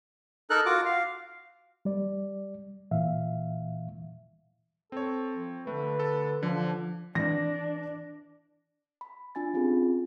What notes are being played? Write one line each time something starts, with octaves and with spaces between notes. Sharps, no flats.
D#4 A4 A#4 F#6
F4 F#4 D6
F5
G3 D5
A#2 E3 E5 F5
C4 A4 C#5
F3
D3 A3 B4
A4
D3 F3 D4
E3 D4 A#6
B5
D4 F4 G#5 B5 A6
C4 C#4 F4 G4 G#4